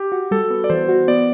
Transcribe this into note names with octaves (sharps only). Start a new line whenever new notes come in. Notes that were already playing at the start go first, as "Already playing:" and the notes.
Already playing: G4
F#4
G3 A4
B3
D5
E3 C5
F#4
B3 D5